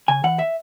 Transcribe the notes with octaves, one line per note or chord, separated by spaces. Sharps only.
C#3 G#5
E3 F#5
E5